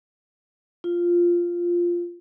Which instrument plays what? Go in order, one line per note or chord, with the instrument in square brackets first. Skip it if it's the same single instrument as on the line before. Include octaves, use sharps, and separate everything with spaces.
[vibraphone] F4